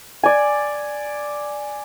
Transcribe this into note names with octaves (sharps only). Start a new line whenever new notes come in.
D5 G#5